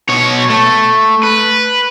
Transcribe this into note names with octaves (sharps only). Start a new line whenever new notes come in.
B2 C#5
A3
B4